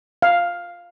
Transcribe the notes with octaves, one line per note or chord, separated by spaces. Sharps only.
F5